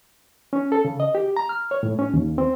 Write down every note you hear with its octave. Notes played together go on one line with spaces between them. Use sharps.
C#4
A4
C#3
D#5
G4
A#5
F6
C#5
A2
C#4
D#2
C4